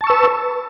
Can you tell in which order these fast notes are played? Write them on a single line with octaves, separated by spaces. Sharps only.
A5 C#6 E6 B4